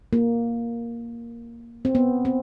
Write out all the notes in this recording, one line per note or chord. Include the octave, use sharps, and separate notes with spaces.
A#3
C4
B3
C4